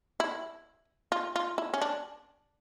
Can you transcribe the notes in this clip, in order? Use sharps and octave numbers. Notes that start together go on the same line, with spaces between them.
E4
F4
F4
E4
C#4
D4